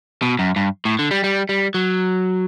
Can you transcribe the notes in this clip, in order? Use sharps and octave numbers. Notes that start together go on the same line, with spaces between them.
B2
F#2
G2
A2
D3
G3
G3
G3
F#3